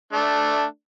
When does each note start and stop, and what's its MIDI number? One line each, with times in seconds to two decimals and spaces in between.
0.13 0.64 57
0.13 0.64 62